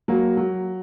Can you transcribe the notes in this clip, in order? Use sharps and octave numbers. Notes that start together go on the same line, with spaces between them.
F#3 A#3
F#3